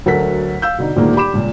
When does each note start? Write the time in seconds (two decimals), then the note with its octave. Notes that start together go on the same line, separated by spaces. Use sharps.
0.06 D2 F#3 A4 A#4 F#5 B6
0.62 F5 E6 G6
0.78 B2 D3 D#4
0.96 D2 A#2 D#3 G#3 A#3
1.15 G4 D5 B5 D6 E7
1.33 C#2 A#2